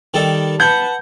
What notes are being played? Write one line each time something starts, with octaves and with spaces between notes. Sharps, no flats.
D#3 G3 A4
B4 F#5 A5 G6